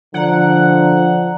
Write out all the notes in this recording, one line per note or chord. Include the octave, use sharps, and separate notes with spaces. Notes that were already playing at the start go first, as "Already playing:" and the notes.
D3 F3 D5 F#5 A#5